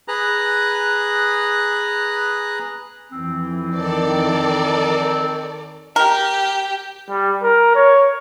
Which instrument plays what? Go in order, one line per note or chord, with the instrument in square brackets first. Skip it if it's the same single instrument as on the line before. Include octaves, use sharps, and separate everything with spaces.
[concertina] G#4 B4 A#5 F#6
[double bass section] F2 E3 [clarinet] C4
[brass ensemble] D#3 [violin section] A4 A#4 D5
[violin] G4 [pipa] A#4
[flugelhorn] G3
A#4
C#5